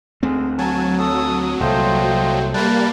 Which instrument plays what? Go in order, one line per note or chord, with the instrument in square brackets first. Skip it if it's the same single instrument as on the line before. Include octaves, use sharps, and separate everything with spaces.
[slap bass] D2 A3 C4 [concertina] G#3
[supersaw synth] F#3 [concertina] G#5 A5
[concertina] A4 E6 [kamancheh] D#6
[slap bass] C2 A#2 [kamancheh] A3 C5 [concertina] F4 D#5 G5
[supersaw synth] G3 A#3 [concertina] B4 A5